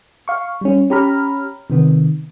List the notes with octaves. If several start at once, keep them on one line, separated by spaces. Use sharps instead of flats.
F5 C#6
G3 C#4
C#4 G4 A#5 B5 F6
C3 D#3 B3